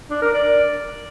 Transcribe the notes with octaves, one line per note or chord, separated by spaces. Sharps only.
D4
A#4
D5